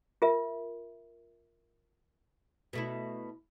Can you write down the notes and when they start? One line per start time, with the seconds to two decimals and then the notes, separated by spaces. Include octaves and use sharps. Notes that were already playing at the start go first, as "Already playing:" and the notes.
0.22 F4 A#4 E5
2.73 B2 A3 E4